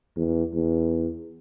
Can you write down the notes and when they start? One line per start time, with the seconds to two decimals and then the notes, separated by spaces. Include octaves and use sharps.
0.17 E2
0.54 E2